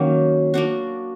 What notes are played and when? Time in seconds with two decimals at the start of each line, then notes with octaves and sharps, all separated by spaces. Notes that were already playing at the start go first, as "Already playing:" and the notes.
Already playing: D#3 F#3 A#3 C#4
0.54 A#3 D4 F#4